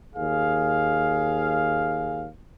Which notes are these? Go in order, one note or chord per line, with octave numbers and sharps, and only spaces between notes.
D#2 G#4 F5